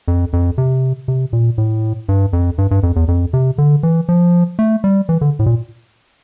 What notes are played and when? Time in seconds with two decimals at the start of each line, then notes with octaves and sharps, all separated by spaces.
0.08 F2
0.33 F2
0.58 C3
1.08 C3
1.33 A#2
1.58 A2
2.09 G2
2.33 F2
2.58 G2
2.71 G2
2.83 F2
2.96 E2
3.08 F2
3.33 C3
3.58 D3
3.83 E3
4.09 F3
4.59 A3
4.84 G3
5.09 E3
5.21 D3
5.39 A2
5.46 A#2